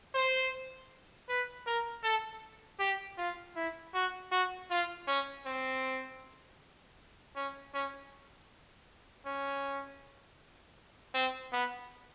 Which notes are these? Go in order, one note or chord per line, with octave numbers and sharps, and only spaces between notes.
C5
B4
A#4
A4
G4
F4
E4
F#4
F#4
F4
C#4
C4
C#4
C#4
C#4
C4
B3